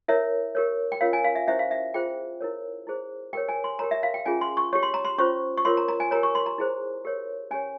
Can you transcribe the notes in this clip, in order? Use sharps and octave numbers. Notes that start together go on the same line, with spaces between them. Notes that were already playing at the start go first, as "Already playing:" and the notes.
E4 A#4 C#5 E5
G4 A#4 C#5
G5
C#4 F4 A#4 C#5 F5
G#5
F5
E5
C#4 E4 G4 C5 E5
F5
E5
F4 G#4 C5 G5
E4 A#4 C#5
E4 G#4 C5
G4 A#4 C#5 G5
G#5
C6
G4 A#4 C#5 A#5
E5
F5
G5
C#4 F4 G#4 G#5
C6
C#6
G4 C#5 C#6
C6
A#5
C6
C#4 F4 C5 C#6
C#6
F4 A#4 C#5 C6
A#5
A#5
G#5
G4 A#4 C#5 A#5
C#6
C6
A#5
E4 G#4 C5
G4 A#4 C#5
C#4 G4 C#5 G#5